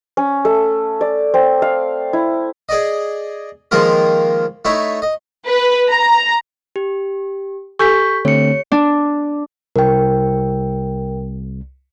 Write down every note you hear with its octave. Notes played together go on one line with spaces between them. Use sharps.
C#4
A3
D5
C4
F5
E4
G#4 D5 D#5
D#3 F3 G#3 A#3 F4 A#4
A3 D#4 E4 C#5
D#5
B4
A#5
G4
G4 A4 G#5 C#6 G6 B6
D3 A3 C4 C#5 C#7
D4
C2 A#4 G5